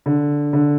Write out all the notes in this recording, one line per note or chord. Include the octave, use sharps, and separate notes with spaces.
D3
D3